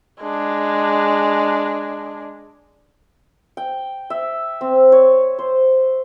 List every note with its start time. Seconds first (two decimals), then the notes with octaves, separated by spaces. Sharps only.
0.20 G#3 D4
3.57 G5
4.10 E5
4.61 C4
4.92 C#5
5.39 C5